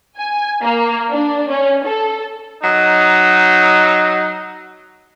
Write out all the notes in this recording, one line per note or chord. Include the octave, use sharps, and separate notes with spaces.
G#5
A#3
D4
C#4
A4
F#3 D#4